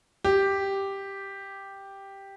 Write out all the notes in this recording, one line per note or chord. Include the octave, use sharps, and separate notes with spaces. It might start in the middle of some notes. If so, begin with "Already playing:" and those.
G4